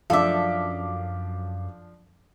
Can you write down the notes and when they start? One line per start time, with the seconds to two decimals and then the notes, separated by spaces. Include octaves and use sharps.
0.10 F#2 F3 D4 A4 E5 F5 D6